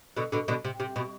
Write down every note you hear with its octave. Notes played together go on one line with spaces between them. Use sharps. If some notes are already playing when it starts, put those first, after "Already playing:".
B2 D3
B2 D3
B2 D3
C3
C3
B2